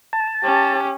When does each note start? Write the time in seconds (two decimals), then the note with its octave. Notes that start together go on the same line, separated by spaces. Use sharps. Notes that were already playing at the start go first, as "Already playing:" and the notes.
0.13 A5
0.44 C#4 G4